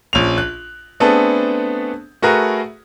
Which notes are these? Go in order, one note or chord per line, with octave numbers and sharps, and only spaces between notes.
A#1 C#4 F7
F#6
A3 B3 C4 D4 G#4 A4
A3 F#4 G#4 A#4 B4